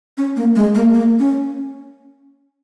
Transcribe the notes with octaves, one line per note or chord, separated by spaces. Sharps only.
C#4
A#3
G#3
A#3
A#3
C#4